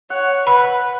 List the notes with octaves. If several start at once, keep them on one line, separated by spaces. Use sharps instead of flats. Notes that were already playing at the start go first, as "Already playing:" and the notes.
C#5 F#5
B4 B5